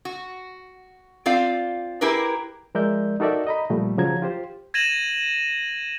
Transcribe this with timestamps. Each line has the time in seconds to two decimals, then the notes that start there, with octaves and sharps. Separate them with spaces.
0.05 F#4
1.26 C4 F4 D5 F5
2.01 E4 G4 G#4 A#4 B4
2.75 F3 G#3 A#4 D5 E5 G6
3.20 D#4 F#4 A4 A#4 D5 E5
3.47 D#5 A#5 B5
3.70 A#2 F3 G3 A3
3.98 C#3 F3 F#3 A#5 G#6
4.22 F4 G4 C5
4.74 G#6 A#6 D#7 E7 F#7